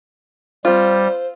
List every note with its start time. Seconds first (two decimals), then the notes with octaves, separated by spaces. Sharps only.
0.65 G3 C4 F4 C5